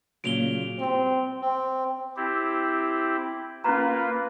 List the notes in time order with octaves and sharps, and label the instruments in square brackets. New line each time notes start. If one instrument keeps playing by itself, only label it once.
[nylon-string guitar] A#2 C#3 F#3 [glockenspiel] D7 F7 G7
[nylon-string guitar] G3 G4 [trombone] C4
[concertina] C4
[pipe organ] C4 E4 G4
[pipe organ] A#3 F4 B4 [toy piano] C#4 A#5